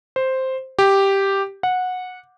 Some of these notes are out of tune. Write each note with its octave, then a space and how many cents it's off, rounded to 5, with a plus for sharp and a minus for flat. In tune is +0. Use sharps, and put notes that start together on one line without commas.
C5 +0
G4 +0
F#5 -15